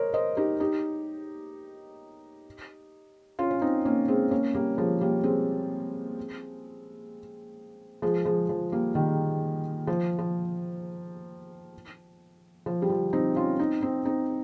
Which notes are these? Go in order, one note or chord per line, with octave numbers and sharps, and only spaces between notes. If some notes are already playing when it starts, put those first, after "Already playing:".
Already playing: A#4 C5 C#5 D#5
C5 D#5
D#4 G4
D#4 G4
C#4 F4
C#4
C4 D#4
A#3 C#4
G#3 C4
A#3 C#4
G3 A#3
F3 G#3
G3 A#3
G#3 C4
F3 G#3
F3 G#3
F3
G3 A#3
D#3 G3
F3
F3
F3
G3
F3
C4 D#4
C#4 F4
C4 D#4
C4 D#4
C4 D#4